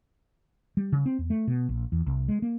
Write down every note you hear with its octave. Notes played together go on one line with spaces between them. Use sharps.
G3
C#3
C4
E2
A3
B2
A#1
E2
C2
G#3
A#3